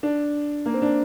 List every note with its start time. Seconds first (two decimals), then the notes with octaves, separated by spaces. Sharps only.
0.03 D4
0.66 A#3
0.74 C4
0.82 D4